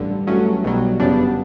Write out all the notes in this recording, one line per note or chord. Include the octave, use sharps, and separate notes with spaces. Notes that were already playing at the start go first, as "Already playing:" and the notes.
Already playing: A1 G2 D3
A1 G2 F#3 A3 C#4
B1 B2 F#3 G3
G1 F#2 C#3 G3 B3 D4